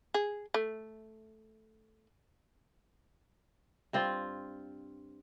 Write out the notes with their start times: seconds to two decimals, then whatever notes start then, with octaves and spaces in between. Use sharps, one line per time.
0.14 G#4
0.54 A3
3.93 G2 C4 F4